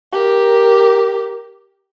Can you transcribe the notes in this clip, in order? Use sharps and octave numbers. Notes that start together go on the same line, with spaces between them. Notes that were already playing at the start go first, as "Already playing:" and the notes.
G4 A#4